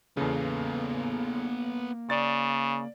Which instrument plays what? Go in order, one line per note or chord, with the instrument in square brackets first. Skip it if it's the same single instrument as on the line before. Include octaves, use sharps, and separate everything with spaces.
[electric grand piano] E2 C#3 [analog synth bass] A#3 [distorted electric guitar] B3 A4
[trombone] C#3 [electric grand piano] D5 A6